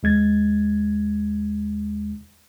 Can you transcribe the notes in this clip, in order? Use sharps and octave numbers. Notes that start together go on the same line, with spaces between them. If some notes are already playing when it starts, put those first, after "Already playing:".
D#2 G#3 G#6 A6